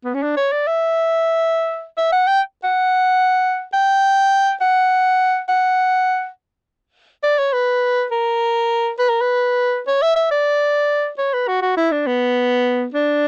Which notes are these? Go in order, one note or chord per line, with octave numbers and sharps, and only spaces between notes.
B3
C#4
D4
C#5
D5
E5
E5
F#5
G5
F#5
G5
F#5
F#5
D5
C#5
B4
A#4
B4
A#4
B4
C#5
E5
E5
D5
C#5
B4
F#4
F#4
E4
D4
B3
D4